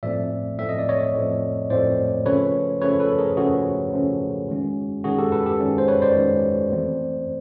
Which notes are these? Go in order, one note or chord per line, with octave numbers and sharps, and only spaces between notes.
A2 F3 A3 C4 D5 E5
A2 F3 A3 C4 E5
D#5
D5
C#5 D#5
A2 F3 A3 C4
A2 F3 A3 C4 C5 D5
C#3 F3 A3 C#4 B4 C#5
C#3 F3 A3 C#4 B4 C#5
A4 B4
G#4 A#4
C#3 F3 A3 C#4 F#4 G#4
C#3 F3 A3 C#4
D#3 G#3 C#4
D#3 G#3 C#4 F#4 G#4
G4 A4
A4 B4
G4 A4
D#3 G#3 C#4
C5
B4 C#5
C5 D5
D#3 G#3 C#4
E3 A3 C4